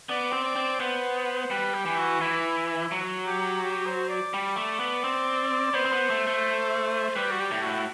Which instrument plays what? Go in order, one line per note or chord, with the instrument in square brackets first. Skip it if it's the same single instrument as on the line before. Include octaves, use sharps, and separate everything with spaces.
[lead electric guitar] B3 [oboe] D5
[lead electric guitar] C4
[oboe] D5
[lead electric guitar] C4
[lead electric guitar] B3 [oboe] C5
[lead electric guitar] G3 [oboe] B4
[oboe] G4
[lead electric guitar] E3
[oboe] F#4
[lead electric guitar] E3 [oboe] E4
[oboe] E4
[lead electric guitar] F#3
[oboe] G4
G4
C5
D5
[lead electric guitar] G3
A3
B3
C4
[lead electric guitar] B3 [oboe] C5
[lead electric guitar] C4
B3
A3
A3
[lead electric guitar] G3 [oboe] B4
[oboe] F#4
G4
[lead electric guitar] A2
[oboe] F#4